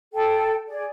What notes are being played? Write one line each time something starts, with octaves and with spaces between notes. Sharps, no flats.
A4 G5
G#4 D5